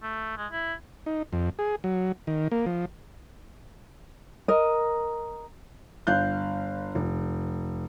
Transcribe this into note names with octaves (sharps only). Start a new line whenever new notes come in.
A3
G#3
E4
D#4
F2
G#4
F#3
D#3
A#3
F3
A#4 D#5
G1 F5 F#6 G6
F1